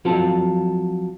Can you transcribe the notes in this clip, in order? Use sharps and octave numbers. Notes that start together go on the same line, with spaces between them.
F3 F#3 C4 F4 A4